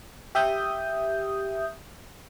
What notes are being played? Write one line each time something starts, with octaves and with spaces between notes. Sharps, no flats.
G4 E5 D#6 G6